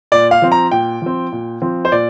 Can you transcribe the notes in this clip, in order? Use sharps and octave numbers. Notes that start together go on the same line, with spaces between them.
A#2 D5
F5
F3 C4
A#5
A#2 G5
F3 C4
A#2
F3 C4
C5
A#2 D5